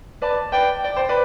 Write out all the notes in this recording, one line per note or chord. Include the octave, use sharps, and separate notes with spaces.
B4 D5 A5
B4 D5 G5
D5 G5
C5
B4 D5